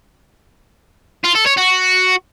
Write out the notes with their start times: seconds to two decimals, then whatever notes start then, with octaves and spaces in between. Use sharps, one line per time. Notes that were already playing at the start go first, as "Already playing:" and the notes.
1.24 F4
1.36 A4
1.47 C#5
1.58 F#4